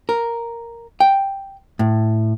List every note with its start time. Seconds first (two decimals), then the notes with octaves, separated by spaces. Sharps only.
0.09 A#4
1.00 G5
1.79 A2